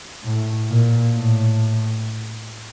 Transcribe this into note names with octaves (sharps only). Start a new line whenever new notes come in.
A2
A#2
A2